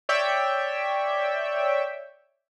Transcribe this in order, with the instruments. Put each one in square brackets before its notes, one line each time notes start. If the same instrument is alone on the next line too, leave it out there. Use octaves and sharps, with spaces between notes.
[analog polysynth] C#5 D5 E5 G5